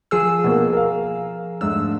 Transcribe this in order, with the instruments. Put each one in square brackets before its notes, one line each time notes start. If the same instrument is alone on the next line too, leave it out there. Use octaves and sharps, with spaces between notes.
[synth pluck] F3 G#4 E6
[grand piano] B2 A#3
A#4 F5
[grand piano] G#2 A3 D4 [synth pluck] E6